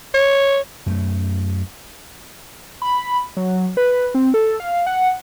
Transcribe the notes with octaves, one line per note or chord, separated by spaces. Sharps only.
C#5
F#2 A3
B5
F#3
B4
C4
A4
F5
F#5